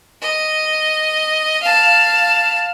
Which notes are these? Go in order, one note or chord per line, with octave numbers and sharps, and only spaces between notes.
D#5
F5 A5